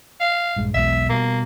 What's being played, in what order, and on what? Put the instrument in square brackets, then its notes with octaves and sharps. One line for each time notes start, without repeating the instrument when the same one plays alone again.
[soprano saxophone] F5
[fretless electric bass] A#1 G2 G#3
[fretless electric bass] B1 E2 G#3 [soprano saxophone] E5
[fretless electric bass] B2 G3 [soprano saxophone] A#3